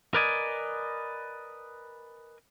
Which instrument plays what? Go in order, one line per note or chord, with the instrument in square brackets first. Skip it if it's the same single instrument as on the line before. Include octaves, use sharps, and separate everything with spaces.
[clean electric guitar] A#4 B4 D5 D#5 G#5